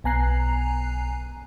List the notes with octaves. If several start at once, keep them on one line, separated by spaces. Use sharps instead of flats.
B1 B3 G#5 A#5 F#6 C7